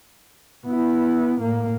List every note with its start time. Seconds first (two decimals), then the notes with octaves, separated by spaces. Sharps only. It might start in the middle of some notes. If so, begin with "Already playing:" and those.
0.66 B3 E4
1.40 A2 A#3